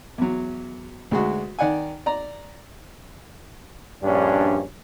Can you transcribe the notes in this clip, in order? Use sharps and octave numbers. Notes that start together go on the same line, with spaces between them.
E2 F#3
D2 G#3 F#4
D#3 D5 F#5 G#5
D5 A#5
A#1 G2 C#4 D4